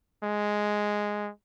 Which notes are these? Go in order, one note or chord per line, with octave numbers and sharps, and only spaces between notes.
G#3